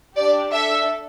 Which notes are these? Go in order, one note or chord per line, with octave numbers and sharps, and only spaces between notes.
D4 G4 D5
D4 A4 E5